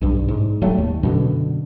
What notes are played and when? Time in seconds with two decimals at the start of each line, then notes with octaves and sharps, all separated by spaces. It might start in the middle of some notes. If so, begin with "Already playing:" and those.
0.01 B1 G2
0.28 G#2
0.62 E1 F#3 G3 A3
0.78 D#2
1.03 F#2 B2 D3